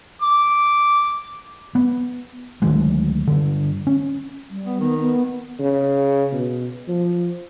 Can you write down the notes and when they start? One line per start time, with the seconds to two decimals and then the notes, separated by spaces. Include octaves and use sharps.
0.22 D6
1.75 B3
2.62 D2 D#3 F#3 G#3
3.27 G2 D3
3.87 C#4
4.50 G3
4.65 B3
4.80 D#3 B3
5.00 B3
5.59 C#3
6.32 B2
6.88 F3